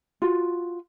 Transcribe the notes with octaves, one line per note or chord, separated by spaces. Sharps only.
F4 F#4